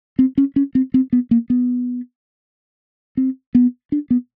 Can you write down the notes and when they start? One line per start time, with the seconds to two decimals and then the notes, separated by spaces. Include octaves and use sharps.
0.19 C4
0.38 C#4
0.56 C#4
0.75 C4
0.94 C4
1.13 B3
1.31 A#3
1.50 B3
3.17 C4
3.55 B3
3.92 D4
4.10 B3